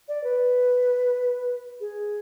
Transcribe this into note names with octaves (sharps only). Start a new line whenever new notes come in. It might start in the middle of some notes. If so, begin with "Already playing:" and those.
D5
B4
G#4